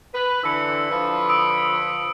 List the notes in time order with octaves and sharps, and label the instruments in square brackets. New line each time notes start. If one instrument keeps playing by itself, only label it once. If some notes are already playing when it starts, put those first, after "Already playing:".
[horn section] B4
[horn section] D3 E3 [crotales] E6 C#7
[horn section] D3 F3 B4
[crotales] D#6 E6 D7